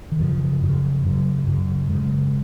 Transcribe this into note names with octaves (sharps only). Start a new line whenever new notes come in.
D#3
F#2 C#3 F3
F#2 C#3
F#2 C#3 F#3
F#2 C#3
F#2 C#3 G#3